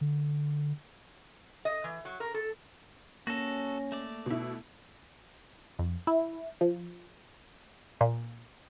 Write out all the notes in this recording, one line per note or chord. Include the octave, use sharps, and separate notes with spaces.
D3
D#5
E3
F#3
A#4
A4
A#3 C#4 F#4 A4 A#6
A3 D5
B2 E4
F2
E4
F3
A#2